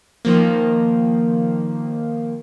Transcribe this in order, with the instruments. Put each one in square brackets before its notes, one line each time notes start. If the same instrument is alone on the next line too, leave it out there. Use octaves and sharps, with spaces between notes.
[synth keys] D#3 F3 A#3